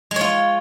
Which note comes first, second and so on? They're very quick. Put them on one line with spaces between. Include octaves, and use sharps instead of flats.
G#3 C#5 F4